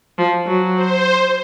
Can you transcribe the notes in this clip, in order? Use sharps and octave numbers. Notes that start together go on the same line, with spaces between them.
F3
F#3
C5